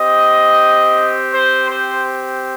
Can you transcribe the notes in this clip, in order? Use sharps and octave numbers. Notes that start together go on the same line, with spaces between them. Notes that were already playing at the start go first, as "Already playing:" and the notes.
Already playing: C4 G4 D#5
C5
C5